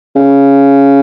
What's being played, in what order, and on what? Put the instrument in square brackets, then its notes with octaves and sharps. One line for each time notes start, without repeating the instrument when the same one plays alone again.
[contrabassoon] C#3